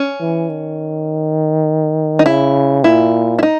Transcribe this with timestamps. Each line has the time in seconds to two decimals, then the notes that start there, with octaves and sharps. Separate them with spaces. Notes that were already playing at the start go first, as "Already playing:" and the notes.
Already playing: C#4
0.20 E3
0.50 D#3
2.19 D#4
2.26 C#3 E4
2.84 A#2 E4
3.39 E4
3.43 D#4